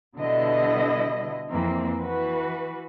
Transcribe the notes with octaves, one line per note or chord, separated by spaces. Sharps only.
B2 D3 G3 E4 D#5
F2 E3 A#3 C4
E3 F#4 B4